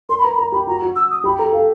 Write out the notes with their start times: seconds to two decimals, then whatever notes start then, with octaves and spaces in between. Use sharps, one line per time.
0.09 A#4 C6
0.18 B5
0.24 B4 A#5
0.34 B5
0.38 A#4 A#5
0.52 G4 B5
0.67 F#4 A#5
0.82 F#4
0.95 E6
1.10 D#6
1.24 G4 B5
1.38 A4 A#5
1.53 A4 F5